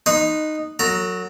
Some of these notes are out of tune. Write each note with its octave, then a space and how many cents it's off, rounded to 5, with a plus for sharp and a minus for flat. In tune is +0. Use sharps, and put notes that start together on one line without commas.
D#4 -10 B4 +0 C6 +0
F#3 -10 A4 +40 A#5 +0